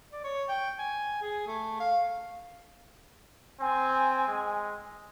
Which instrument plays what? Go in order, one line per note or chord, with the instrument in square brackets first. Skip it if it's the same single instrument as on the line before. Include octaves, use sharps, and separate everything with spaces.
[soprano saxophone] D5
C#5
G5
G#5
G#4
A3
F5
[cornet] C4 [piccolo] G#5
[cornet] G#3